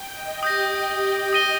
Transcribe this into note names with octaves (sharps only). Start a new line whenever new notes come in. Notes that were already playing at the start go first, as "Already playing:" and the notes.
Already playing: G5
D#5
G4 D#6 G6 A#6
D#6 A#6 D#7 G7